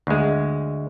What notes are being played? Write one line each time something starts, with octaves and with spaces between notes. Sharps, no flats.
D2 G#3